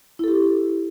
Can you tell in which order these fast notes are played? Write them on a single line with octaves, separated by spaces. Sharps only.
E4 A4 G4